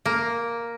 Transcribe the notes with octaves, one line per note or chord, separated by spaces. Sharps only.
A#3